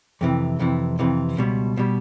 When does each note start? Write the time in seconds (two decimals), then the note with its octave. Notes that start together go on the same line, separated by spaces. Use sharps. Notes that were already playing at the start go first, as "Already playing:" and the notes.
0.21 F2 C3 E3
0.59 F2 C3 E3
0.99 F2 C3 E3
1.37 C#2 B2 G3
1.77 B2 G3